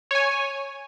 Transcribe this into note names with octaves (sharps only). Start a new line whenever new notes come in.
C#5 G#5